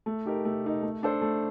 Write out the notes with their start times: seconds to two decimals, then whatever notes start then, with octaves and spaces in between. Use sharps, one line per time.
0.06 A3
0.26 D#4 G4 A#4
0.45 A3
0.65 D#4 G4 A#4
0.83 A3
1.03 D4 A4 C5
1.22 A3